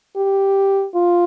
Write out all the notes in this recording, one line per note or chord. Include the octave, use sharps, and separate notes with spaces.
G4
F4